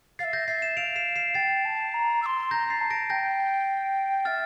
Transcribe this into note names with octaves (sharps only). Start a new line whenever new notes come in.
E5 F5 A6 C7
G6 A#6
E5 A6 C7
C7 E7
F5 D7 F7
C7 E7
C7 E7
G5 A6 C7
A5
A#5
E6
C6
A#5 G6 A#6
A6 C7
A5
A#6 D7
G5 G6 A#6
E5 F6 A6